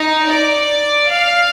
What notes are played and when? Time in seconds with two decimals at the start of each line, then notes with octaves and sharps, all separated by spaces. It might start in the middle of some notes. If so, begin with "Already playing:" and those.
Already playing: D#4
0.31 D5
1.12 F5